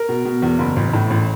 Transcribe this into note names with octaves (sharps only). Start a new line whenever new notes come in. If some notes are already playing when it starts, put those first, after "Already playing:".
Already playing: A#4
B2
B2
E2
F#1
A1
A2
A1